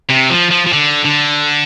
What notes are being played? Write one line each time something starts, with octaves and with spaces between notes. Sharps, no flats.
C3
F3
F3
F3
D3
D3